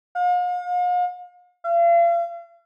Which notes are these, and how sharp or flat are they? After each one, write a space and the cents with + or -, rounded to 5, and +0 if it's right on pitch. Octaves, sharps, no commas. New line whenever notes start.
F5 +45
F5 -40